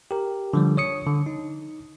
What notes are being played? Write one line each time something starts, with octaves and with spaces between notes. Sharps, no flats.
G4 A#4
D3 F3 G3
C#5 D#6 C#7
D3
D#4